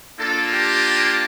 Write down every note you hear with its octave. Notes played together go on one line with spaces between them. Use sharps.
A#3 D4 F4 A4
G4